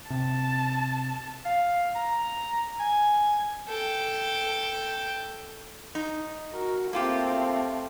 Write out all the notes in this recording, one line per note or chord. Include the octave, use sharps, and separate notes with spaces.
C3 A5
F5
A#5
G#5
A4 G5
D#4
F#4 A#4
A3 A#3 C4 F4 G4